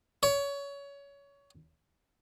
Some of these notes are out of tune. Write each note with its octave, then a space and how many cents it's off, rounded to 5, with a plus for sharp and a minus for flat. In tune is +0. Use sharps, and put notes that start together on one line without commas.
C#5 +25